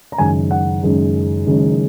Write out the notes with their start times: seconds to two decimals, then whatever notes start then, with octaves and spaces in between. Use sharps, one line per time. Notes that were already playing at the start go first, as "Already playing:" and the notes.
0.12 A#5
0.18 F#1 F#2 D#3 G#3 G#5
0.51 F#5
0.82 F#1 F#2 D#3 G#3
1.46 F#1 F#2 D#3 G#3